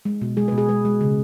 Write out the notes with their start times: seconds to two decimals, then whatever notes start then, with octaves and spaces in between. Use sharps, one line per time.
0.05 G#3
0.22 B2
0.37 G#3 G#4
0.48 B2 B4
0.58 G#4
0.69 G#3 B4
0.85 G#3
1.01 C#3